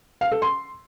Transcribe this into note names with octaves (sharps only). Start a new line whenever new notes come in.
F5
A4
C6